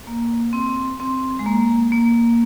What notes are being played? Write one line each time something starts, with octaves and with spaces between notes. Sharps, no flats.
A#3
C4
C4
G#3
A#3
A#3